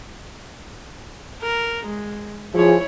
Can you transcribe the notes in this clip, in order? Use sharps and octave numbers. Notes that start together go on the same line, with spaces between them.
A#4
G#3
F3 E4 G#4 C#5